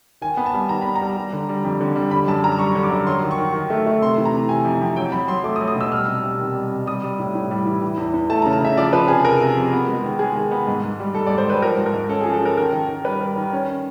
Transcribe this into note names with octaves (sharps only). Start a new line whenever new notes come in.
D#3 G#5
B3
A5
G3
D#3 A#5
B3 B5
A#5
G3
G3
D3
G3
F2
D3
G3
D3 B5
F#2 A5
G3 A#5
G3 C#6
D3
D6
F#2
F#3 C6
D#3
C#6
D#3
D#3
A3
A3
C3 C6
E3
A#5
C3
C3 G#5
F2
F2
F#3 G5
F#3 B5
F#3 C6
A3 D6
D#6
F#3
D#6
B2 E6
G3 F6
C3
C3
D#3
G3
C3
G3 D#6
G3
A2
A2
G3
E3
E3
E2
E2
A3 A5
A#5
C#3
A5
C#3 E5
F3 D5
F3 B4
C3 G#4
C3 A#4
C3
F2
B3
G#3
D#3
G#3 G#4
D#3
B3
G#2
G#2
G3
G#2 A4
D5
G#2
C5
D#3 B4
F3 A#4
G#2
A#4
G#2
C#4 A4
G#4
F3
A4
C#4 A#4
D#3 A#4
D#3
D#3
G3 B4
G3
D#3
C#4